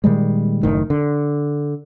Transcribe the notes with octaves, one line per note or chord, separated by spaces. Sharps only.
A#2 D#3 G3 G#3
F#1 A2 D#3
D3